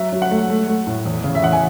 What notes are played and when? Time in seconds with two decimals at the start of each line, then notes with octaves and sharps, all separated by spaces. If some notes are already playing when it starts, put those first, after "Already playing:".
Already playing: F#3 E5
0.12 F#3
0.22 F#5
0.31 A3
0.50 A3
0.68 A3
0.87 A2
1.06 E2
1.24 C#3
1.35 E5
1.42 E2 F#5
1.53 G#5